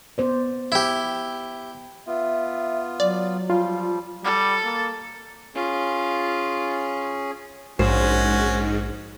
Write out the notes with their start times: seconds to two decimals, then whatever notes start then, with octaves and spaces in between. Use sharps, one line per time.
0.18 B3 C5 D5
0.72 E4 G4
2.07 B3 F4 E5
3.00 F#3 D5
3.50 F3 G3 F4
4.24 G3 A4
4.65 A#3
5.55 C#4 F4 G#4
7.79 A#1 G#2 C#4 F#4 C5